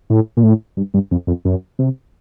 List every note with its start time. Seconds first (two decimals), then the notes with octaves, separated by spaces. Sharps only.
0.10 A2
0.37 A#2
0.43 A2
0.77 G2
0.94 G2
1.11 F2
1.27 F2
1.45 F#2
1.79 C3